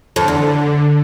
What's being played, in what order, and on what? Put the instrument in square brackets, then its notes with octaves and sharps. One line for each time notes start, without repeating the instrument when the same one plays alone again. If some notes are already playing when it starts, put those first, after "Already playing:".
[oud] F2 [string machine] D3
[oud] E2